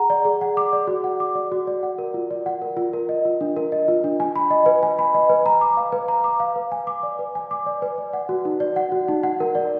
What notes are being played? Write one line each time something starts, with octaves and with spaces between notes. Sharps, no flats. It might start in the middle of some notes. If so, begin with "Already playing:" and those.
Already playing: G#4 F#5 A#5
D5
G#4
F#5
D6
D5
F#4
F#5
D6
D5
F#4
D5
F#5
A#4
F4
D5
F#5
A#4
F4
A#4
D#5
F4
D4
A#4
D#5
F4
D4
G#5
B5
D#5
B4
G#5
B5
D#5
B4
A#5
D6
F5
B4
A#5
D6
F5
B4
G#5
D6
D5
B4
G#5
D6
D5
B4
D5
F#5
F#4
D#4
D5
F#5
F#4
D#4
F#5
A#4
D5